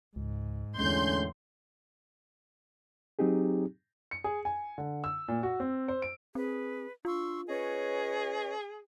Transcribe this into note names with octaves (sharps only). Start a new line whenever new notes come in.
C#2 G#2
E2 A2 D3 G#3 C#4 C6 G6
F#3 C4 D#4 G4 G#4
C#7
G#4
G#5
D3
E6
A#2
F#4
C4
C5
D7
C4 G#4 B4
D4 F4 C6 C#6 E6
C#4 G#4 B4 C#5 D#5